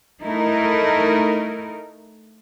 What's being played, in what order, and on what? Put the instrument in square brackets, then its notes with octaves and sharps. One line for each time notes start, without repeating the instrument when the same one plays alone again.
[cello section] A3 D#4 E4 A#4